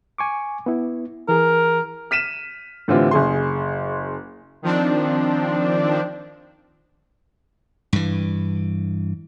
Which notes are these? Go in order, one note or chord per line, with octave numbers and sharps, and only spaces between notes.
G#5 C#6 D6
B3 E4
E3 G#4 A#4
F6 B6 D#7 E7
A2 D3 E3 C4 F4 G4
F#1 G#4 C6
D#3 F3 C4 D4
G2 E3